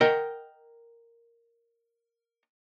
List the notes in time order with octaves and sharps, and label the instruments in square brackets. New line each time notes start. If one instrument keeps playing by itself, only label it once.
[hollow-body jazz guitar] A#4 D#5 F#5 G5